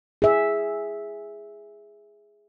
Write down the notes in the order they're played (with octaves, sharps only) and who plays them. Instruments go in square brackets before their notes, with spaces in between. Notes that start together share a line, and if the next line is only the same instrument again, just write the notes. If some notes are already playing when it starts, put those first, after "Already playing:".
[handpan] G#4 E5